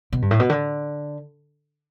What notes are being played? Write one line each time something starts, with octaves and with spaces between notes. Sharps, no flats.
B2
G2
A2
B2
D3